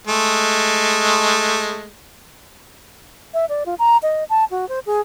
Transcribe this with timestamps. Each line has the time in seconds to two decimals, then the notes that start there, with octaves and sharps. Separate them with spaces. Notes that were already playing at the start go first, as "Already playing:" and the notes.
0.07 G#3 A3
3.34 E5
3.49 D5
3.66 F4
3.79 A#5
4.03 D#5
4.30 A5
4.51 F#4
4.69 C5
4.86 G#4